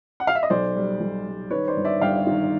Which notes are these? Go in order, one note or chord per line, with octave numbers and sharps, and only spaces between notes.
F#5
F5
E5
D#5
B1 C5 D5
G3
B1
G3
D#3 B4 C#5
C5 D5
G1
D5 E5
G1 F5 G5
D#3